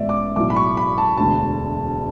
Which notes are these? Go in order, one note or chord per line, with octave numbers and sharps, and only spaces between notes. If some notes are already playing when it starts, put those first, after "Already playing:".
Already playing: A1 A2 G#3 B3 D5 E5
D6
B1 A2 E3 D6
B5
C#6
B5
A5
E1 D2 D3 A5